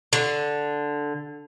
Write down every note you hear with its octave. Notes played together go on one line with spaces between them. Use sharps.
D3